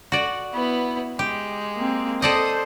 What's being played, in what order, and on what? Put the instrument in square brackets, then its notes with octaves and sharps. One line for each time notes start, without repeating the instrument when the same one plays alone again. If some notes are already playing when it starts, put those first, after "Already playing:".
[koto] F#4 D5
[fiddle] B3 E4
[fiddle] G#3 [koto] G4
[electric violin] A#3 C4
[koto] A4 D5 D#5 [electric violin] C5 [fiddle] D#6